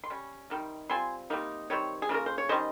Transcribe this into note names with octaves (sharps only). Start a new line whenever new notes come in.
C6
G3 C#4
C3 D#3 G3
G3 C4 F4 G#5 C6
C3 G3 A#3 D#4
D#3 G3 C4 C#5
G#4
C#3 F3 A#3 F4
A#4
C5
C#5
D#3 G3 C#4 C5 D#5